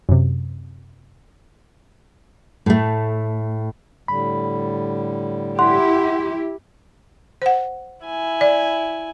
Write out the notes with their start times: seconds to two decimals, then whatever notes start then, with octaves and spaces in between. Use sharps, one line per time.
0.09 F#2 C3
2.66 A2 A3
4.08 A2 D3 G3 B5
5.59 E4 G4 F#5 C6
7.42 C5 F#5
8.05 E4 G#5
8.41 D5